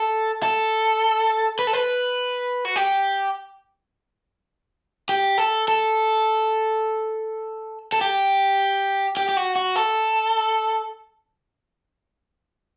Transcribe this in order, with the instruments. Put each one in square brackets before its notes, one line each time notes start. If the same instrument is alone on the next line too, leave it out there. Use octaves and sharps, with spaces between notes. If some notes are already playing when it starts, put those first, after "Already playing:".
Already playing: [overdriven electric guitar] A4
A4
B4
A4
B4
F#4
G4
G4
A4
A4
A4
G4
G4
G4
F#4
F#4
A4